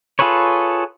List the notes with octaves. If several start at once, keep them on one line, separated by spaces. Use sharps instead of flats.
F4 G#4 A4 B4 C#5